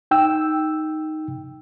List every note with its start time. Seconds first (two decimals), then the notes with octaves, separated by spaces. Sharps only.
0.11 D#4 G5 E6